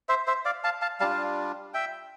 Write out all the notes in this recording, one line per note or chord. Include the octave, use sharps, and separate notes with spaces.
C5 E5
C5 E5
D5 F5
F5 A5
F5 A5
G3 D4 F4 F5 A5
E5 G5